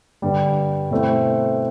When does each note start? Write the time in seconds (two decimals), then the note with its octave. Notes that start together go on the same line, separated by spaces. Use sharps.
0.22 G2 D3 G3
0.91 B2 A3 C4 E4